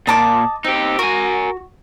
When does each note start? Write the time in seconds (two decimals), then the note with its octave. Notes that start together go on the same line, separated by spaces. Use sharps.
0.07 A#2 D#5 A5 D6
0.64 C4 D#4 G4
0.99 F#4 A#4 G#5